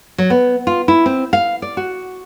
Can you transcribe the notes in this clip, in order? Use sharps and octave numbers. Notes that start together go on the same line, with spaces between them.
F#3
B3
F4
E4
C4
F5
D5
F#4